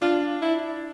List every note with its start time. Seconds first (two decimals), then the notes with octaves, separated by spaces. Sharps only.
0.02 D4 F4
0.42 E4